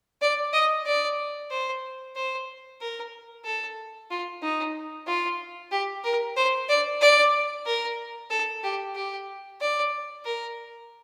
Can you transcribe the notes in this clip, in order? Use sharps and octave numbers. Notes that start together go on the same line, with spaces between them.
D5
D#5
D5
C5
C5
A#4
A4
F4
D#4
F4
G4
A#4
C5
D5
D5
A#4
A4
G4
G4
D5
A#4